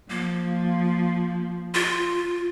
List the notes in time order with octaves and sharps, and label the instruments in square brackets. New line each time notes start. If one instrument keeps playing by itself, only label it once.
[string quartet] F3 [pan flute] A#3
[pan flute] F4